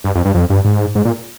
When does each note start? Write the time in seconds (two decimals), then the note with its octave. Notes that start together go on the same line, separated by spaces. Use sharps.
0.04 G2
0.15 F2
0.25 G2
0.34 F2
0.50 G2
0.65 G#2
0.95 G#2
1.05 A#2